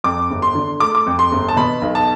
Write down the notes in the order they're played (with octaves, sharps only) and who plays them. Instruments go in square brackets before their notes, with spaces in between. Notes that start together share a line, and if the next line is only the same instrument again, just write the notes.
[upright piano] F2 D6
G1
C6
D3
A3 D6
D6
F2
C6
G1
A5
B2 B5
B1
A5